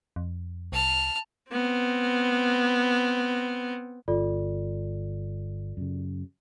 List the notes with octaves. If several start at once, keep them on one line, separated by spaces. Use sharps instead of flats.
F2
C2 A5 F6
B3 C4
G1 F4 A4 D5
F#2 C#3